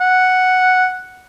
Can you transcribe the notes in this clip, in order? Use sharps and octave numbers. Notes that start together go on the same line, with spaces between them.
F#5